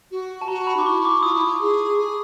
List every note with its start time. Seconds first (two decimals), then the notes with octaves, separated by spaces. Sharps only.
0.11 F#4
0.41 A5
0.48 F#4 A#5
0.67 B5
0.77 D#4 D6
0.86 E4 C#6
1.05 D6
1.23 F4 D#6
1.35 E4
1.45 F4
1.61 G#4
1.98 G#4